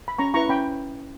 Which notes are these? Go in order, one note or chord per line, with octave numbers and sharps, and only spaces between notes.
B5
C#4 A#5 C#6
E4 B4 A#5 C#6
C#4 G5 B5